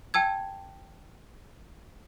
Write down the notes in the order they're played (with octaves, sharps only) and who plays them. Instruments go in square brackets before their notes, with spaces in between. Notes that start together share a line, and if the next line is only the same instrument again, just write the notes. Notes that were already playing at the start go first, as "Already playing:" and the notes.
[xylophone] G5 A5 E6 G#6